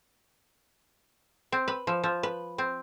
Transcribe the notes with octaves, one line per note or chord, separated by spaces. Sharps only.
C4
B4
F3
F3
B4
C4